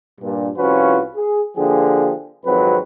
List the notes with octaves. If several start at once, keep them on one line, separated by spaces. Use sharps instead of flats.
G2 A#2
C2 F3 C#4 F4 F#4 B4
G#4
D3 F3 A#3 G4 G#4
G#1 F2 F#3 C4 B4